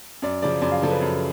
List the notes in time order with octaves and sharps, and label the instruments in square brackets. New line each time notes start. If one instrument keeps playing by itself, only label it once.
[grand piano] F#2 D5
C#3 F3 D5
F#2 D5
F5
C#3 F3 A4
B4
F#2